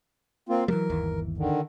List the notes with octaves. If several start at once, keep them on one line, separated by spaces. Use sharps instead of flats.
A#3 C4 F4
E3 F#3 G3 A#4
G1 D#2 E3
D3 D#3